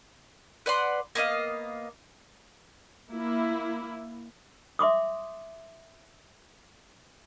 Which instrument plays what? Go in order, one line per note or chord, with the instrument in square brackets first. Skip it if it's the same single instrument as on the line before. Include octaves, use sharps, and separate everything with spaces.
[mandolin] B4 D5 F#5 C6
A#3 B3 D#5 F5
[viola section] A#3 E4
[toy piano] E5 C6 D6 D#6